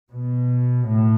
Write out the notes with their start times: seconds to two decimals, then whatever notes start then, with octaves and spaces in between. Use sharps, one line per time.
0.11 B2
0.87 A2